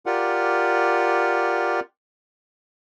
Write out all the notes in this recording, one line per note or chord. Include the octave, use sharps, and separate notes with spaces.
F4 G4 A#4 D5 F#5